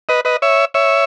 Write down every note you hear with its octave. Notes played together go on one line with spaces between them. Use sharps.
B4 D#5
B4 D#5
C#5 E5
C#5 E5